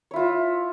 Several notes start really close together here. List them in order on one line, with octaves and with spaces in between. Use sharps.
C#5 E4 F4 E5